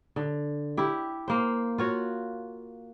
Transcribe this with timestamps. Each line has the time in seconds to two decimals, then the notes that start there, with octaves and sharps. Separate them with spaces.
0.16 D3
0.77 E4 G4
1.28 A#3 C5
1.78 F4 F#4 C#5